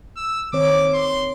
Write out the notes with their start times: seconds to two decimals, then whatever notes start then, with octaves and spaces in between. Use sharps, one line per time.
0.17 E6
0.53 D#3 C4 C#5 D6
0.94 C6